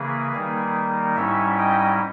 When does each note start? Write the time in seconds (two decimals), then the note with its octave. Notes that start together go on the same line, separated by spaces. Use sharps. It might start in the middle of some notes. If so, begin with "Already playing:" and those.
Already playing: C#3 E3 A#3 G#4 B4
0.32 D#3 G3 A#3 D#4
1.16 G#2 G3 C#4 E4 C#5 E5
1.58 D#5 G5